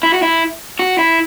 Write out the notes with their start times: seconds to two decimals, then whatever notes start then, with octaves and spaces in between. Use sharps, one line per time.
0.03 E4
0.14 F#4
0.23 E4
0.79 F#4
0.98 E4